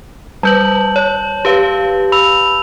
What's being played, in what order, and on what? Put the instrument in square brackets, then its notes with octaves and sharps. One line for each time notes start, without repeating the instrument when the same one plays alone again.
[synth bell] G3 B4 [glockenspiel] A5 G6 F#7
[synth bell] C#5
G4 B4 F5
[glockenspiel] B5 E6 F7